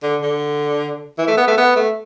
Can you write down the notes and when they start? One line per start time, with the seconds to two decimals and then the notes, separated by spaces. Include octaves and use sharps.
0.03 D3
0.22 D3
1.19 E3
1.28 A3
1.37 B3
1.48 A3
1.58 B3
1.76 A3